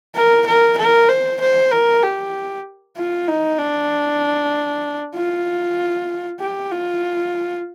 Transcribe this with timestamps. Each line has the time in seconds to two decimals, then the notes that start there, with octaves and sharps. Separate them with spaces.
0.15 A#4
0.46 A#4
0.78 A#4
1.09 C5
1.41 C5
1.72 A#4
2.03 G4
2.97 F4
3.28 D#4
3.59 D4
5.15 F4
6.40 G4
6.72 F4